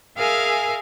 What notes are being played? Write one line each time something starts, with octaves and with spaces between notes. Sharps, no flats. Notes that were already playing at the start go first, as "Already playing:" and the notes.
G#4 A#4 E5 F5 G#5